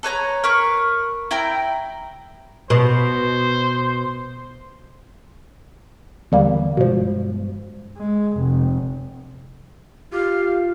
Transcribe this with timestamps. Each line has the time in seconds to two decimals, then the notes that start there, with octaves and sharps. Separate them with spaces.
0.03 A4 B4 C#5 A#5
0.44 A#4 B4 C#6
1.31 E4 G5 A#5
2.70 B2 C5
6.32 D#2 D3 E3 G3 A#3 B3
6.77 G2 B2 F3 G#3
7.98 G#3
8.37 F1
10.13 F4 G4 F5